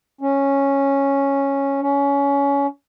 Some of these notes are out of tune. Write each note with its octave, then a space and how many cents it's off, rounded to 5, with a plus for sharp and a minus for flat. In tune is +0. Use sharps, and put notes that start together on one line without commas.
C#4 -5
C#4 +20